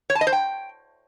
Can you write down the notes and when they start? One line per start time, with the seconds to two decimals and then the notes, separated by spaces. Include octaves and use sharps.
0.10 C#5
0.15 A5
0.21 D#5
0.27 C5
0.33 G5